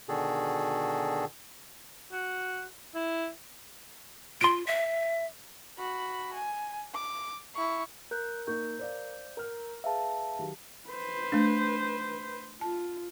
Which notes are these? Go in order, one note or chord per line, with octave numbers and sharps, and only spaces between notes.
B2 D3 D#3 F#4 G#4 A4
F#4
E4
F4 C6 D7
E5
F#4 B5
G#5
D6
E4 C#6
A#4 F#6 G6
A#3 D#4 C#6 G6
C5 D5 F5
A#4 A#5 F6
G#4 B4 E5 F5 A5
D#3 F#3 G4
B4 C5
A3 D4
F4 A5